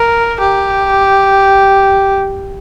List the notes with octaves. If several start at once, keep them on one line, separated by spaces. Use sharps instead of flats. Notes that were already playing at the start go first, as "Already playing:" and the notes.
Already playing: A#4
G4